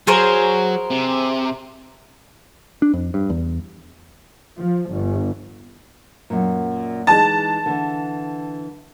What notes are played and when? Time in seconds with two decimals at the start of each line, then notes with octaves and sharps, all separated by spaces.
0.07 F#3 G#4 A#4 C5
0.91 C3
2.82 D4
2.93 F2
3.14 G2
3.30 E2
4.58 F3
4.90 G1
6.30 F#2 A#2
7.07 E3 G#3 D#4 A5
7.66 D3 E3